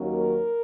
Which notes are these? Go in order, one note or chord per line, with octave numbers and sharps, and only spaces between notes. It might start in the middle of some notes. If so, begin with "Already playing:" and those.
Already playing: D#2 D#3 F#3 A#3 C#4
A#4